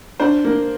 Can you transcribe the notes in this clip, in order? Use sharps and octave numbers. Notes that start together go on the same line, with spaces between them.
D4 C5
A#3